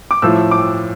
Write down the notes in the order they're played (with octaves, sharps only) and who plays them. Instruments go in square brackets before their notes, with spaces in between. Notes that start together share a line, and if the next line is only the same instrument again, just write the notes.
[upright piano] D6
A2 F3 E6
D6